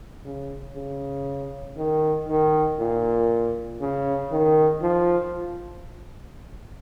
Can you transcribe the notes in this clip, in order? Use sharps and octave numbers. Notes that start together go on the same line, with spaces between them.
C#3
C#3
D#3
D#3
A#2
C#3
D#3
F3